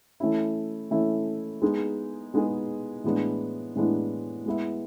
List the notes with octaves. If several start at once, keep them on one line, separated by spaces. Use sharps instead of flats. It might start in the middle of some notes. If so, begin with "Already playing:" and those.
E3 A3 C#4 E4
E3 A3 C#4 E4
G#3 B3 D#4 G#4
G#3 B3 D#4 G#4
A2 E3 G#3 B3 D4
A2 E3 G#3 B3 D4
G#3 B3 E4